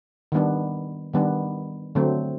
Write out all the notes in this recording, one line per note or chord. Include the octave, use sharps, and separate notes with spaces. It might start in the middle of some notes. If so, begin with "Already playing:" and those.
D#3 G3 B3 D4
D#3 G3 B3 D4
D3 F#3 A3 C4